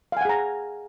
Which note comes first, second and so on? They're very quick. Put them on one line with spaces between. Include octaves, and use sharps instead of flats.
F5 G#5 F#5 G#4 A#5